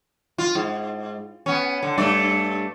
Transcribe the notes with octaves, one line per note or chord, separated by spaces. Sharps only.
F4
G#2
B3 C#4
D3
G2 A3 D5